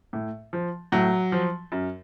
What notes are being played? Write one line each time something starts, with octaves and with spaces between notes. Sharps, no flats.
A2
F3
A2 F#3
F3
F#2